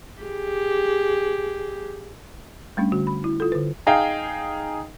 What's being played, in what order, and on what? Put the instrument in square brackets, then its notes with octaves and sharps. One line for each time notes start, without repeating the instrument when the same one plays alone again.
[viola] G4 G#4
[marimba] G3 A3 C#4 D4
D3 F#4
B5
E4
F4 A4
D3 B4
[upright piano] D#4 G#4 D#5 F5 G5